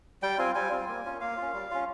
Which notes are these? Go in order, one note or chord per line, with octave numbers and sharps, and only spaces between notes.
G3 G5
C4 F4 G#5
G3 G#5
C4 F4
A#3
C#4 F4
A#3 F5
C#4 F4
G3
C#4 F4